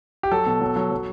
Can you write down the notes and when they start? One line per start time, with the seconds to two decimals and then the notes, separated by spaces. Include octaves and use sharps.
0.23 G4
0.31 F#3 A4
0.46 B2
0.61 F#3
0.76 F#3
0.91 F#3